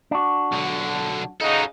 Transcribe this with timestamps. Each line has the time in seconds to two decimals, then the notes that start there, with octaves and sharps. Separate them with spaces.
0.11 D4 F#4
0.52 B1 D3
1.40 C#3 D#4 F#4 A4